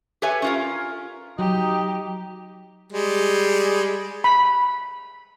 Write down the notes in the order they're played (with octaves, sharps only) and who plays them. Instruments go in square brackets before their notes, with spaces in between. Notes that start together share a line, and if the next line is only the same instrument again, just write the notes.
[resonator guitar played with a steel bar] G4 A4 B4 C#5 E5 G#5
C#4 F4 A#4
[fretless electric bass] F#3 [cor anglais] D#4 [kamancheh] G4
[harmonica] G3 G#3
[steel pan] B5